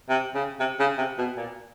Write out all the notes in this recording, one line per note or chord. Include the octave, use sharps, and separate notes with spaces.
C3
C#3
C3
C#3
C3
B2
A#2